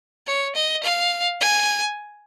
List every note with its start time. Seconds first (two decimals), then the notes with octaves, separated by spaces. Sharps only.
0.27 C#5
0.55 D#5
0.83 F5
1.41 G#5